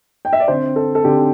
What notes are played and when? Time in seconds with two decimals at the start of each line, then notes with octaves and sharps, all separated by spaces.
0.25 G5
0.33 E5
0.40 D5
0.48 D3 C4 C5
0.76 A4
0.95 A4
1.04 D3 C4 G4